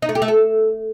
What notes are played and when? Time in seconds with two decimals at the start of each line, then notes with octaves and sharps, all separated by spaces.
0.02 D#4
0.09 A3
0.15 G4
0.22 A3
0.28 A4